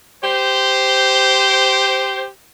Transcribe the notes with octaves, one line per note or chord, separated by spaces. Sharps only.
G4 C5